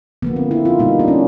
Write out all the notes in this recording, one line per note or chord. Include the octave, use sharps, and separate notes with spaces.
D3 F3 A#3 B3
C4
E4
F4
B2 G3 A#3 D#4
D4
C#4